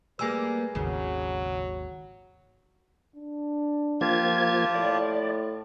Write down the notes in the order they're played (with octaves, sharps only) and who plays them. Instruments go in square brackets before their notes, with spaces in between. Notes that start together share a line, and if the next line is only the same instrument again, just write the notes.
[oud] G3 A#3 [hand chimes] G#4 G#5 E6 [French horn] B4
[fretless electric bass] G#1 D#2 [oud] C#3 [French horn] F#3
[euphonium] D4
[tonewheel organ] F3 A#3 G#6 [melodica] F4 G4 A5
[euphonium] A2 [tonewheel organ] D5